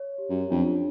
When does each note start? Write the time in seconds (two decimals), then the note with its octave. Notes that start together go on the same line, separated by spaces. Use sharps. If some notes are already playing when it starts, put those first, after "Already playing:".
Already playing: C#5
0.18 G4
0.29 F#2
0.51 F2 D4